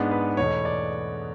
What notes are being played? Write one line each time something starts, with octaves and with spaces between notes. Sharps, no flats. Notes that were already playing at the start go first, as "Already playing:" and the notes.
Already playing: G#2 G#3 B3 D4
B4
E2 B2 A3 C#5
D5